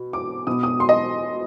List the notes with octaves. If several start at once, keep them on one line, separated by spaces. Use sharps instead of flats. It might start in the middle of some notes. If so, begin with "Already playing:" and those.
Already playing: B2
D6
B2 B3 D#6
D#6
C6
D#5